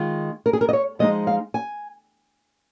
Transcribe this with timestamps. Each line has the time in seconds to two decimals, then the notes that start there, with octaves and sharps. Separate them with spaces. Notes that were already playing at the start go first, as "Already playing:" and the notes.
Already playing: D#3 G#3 F4
0.46 A#4
0.53 G#4
0.61 A#4
0.69 D#5
0.73 C#5
0.99 F3 G#3 D#4 D#5
1.27 F5
1.54 G#5